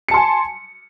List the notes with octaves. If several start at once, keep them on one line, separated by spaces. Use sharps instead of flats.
G#5 A5 C6 C#7